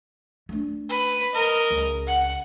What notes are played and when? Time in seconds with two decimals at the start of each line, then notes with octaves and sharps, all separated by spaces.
0.49 A3 D4
0.89 B4
1.33 A#4 D#5
1.70 C#2
2.07 F#5